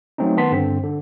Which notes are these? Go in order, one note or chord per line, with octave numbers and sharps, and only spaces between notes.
F#3 A3 C4 C#4 D#4
D#3 B3 A5 C6 B6
G2 D3 C4
D3